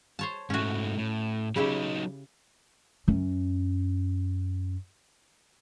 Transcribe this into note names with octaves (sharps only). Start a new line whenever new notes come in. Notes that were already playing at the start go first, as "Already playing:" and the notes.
C5 C#5 A5
G#2 A3 C#4 F#4
A2
C#3 F#3 D#4 E4 G4
F#2 C#4